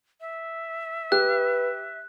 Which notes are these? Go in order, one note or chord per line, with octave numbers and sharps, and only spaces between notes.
E5
G4 B4 F#6